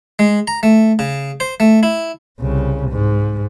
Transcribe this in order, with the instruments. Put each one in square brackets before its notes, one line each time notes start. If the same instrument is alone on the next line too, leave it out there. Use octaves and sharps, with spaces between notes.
[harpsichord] G#3
A#5
A3
C#3
C5
A3
E4
[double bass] C2 C#3
G#2